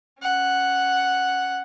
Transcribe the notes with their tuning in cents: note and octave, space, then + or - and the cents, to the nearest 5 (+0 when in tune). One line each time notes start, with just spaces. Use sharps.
C#4 +5 F#5 +0